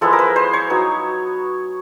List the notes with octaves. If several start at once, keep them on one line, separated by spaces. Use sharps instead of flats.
F3 G#3 B3 E4 A4
A#4
B4
C5
C#5
F#3 B3 D#4